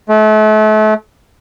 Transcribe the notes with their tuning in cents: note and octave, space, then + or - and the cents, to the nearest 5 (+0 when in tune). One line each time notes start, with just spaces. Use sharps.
A3 -35